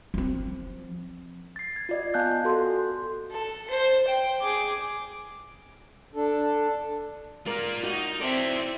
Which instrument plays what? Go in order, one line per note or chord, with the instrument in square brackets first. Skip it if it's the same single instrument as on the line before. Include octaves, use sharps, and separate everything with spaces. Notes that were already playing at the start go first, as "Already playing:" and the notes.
[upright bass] F3 C4
[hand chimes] A6 C7
G#6
F4 D5 D#5
B3 F5 G#5 A5 F#6 G6
F#4 A4 C6
[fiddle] A4
C5
G5
G#4 D6
[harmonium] D4 A4
[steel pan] G#3 A#4 [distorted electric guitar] F4 D5
[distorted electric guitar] D#4 D#5 [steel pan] F#4
[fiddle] C4 E5 [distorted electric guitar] E4 D5 [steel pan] A4